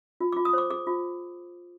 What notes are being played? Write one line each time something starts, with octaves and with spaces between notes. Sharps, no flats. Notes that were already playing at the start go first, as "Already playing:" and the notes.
F4
D6
F4
D#6
C5 D6
G#4 D6
F4